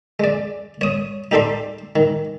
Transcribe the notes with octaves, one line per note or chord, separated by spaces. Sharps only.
G#3 D5
C#5 D#6
D#4 G4 A4 D5 C6
D#3